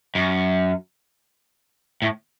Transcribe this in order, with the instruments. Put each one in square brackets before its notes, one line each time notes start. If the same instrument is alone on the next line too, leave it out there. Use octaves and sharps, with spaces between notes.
[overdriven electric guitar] F#2
A2